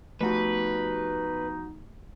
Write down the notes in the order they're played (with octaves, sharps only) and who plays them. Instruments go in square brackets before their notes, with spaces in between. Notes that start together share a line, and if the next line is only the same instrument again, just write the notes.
[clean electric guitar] F3 F#4 [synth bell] A3 B3 G4 [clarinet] D#4 [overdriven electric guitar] B4